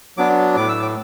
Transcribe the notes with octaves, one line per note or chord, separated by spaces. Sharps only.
F#3 B3 D4 D6
A2 D6
E6
D6